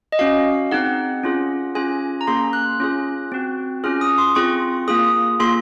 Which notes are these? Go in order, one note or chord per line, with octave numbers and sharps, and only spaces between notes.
D#5
C#4 F#4 F5
C4 D#4 G#4 F#5
C#4 F4 G#4
C#4 F4 G#4 G#5
A#5
A#3 C#4 G#4 C6
F#6
C#4 F4 G#4
C4 F#4
C#4 F4 G#4 F6
D#6
C6
C4 F4 G#4 C#6
A#3 F4 G#4 D#6
A#3 F4 G#4 C6